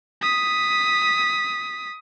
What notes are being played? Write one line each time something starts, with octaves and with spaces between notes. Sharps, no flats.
D#6 B6